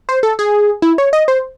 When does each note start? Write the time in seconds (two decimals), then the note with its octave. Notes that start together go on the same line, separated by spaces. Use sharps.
0.09 C5
0.23 A4
0.39 G#4
0.82 E4
0.98 C#5
1.13 D#5
1.28 C5